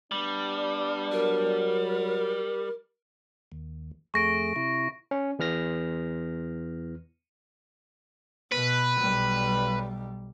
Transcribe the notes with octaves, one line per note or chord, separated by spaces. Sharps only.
G3 B3 D4
F#3 A#4
D#2
F2 A3 G#4 C#6 A#6 D7
C3 E4
C#4
E2 E3 F6 A#6
B2 B4
B1 G3